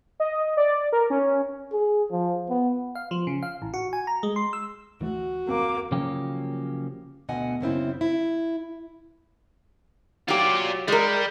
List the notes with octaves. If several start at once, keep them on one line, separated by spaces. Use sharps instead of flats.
D#5
D5
A#4
C#4
G#4
F3
B3
F5
F3
C#3
F5
A1
F#4
G#5
A#5
G#3
C6
E6
D2 E3 A3 F#4
D1 F2 A#3 C4 D6
C#3 F3 F#3 A#3 C#4 G4
D2 B2 D3 D#5 F#5 G#5
F#2 C#3 C4 E4
E4
F#3 F4 G4 D5
G3 G#3 A#4